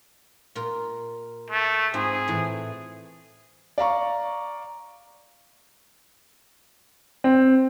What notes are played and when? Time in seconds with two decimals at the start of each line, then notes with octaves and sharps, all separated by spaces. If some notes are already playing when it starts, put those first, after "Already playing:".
0.55 A#2 F4 A#4
1.50 A3
1.94 G#2 C4 F4 G#4
2.28 A2 E3
3.78 D5 F5 A#5 C#6
7.24 C4